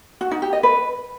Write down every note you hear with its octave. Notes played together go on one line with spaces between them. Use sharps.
F#4
D#4
G4
D#5
B4